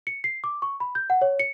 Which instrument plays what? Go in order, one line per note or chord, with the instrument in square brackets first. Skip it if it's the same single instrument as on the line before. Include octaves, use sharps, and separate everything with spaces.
[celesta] C#7
C7
D6
C#6
B5
G6
F#5
C#5
C#7